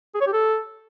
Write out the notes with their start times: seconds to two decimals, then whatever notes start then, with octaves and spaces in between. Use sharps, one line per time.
0.15 G#4
0.21 C#5
0.27 G4
0.33 A4